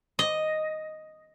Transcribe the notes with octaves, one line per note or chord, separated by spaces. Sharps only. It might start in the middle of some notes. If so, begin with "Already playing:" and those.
D#5